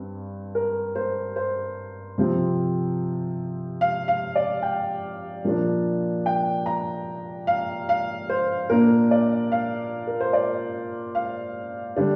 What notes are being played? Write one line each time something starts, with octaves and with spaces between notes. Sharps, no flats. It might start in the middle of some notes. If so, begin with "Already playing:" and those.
Already playing: G2 C4
A#4
C5
C5
C3 F3 C4
F5
F5
D5
G5
A#2 F3 A#3 D4
G5
A#5
F5
F5
C5
A#2 A#3 D4 A#4
D5
F5
A#4
C5
D5
F5
D3 G3 D4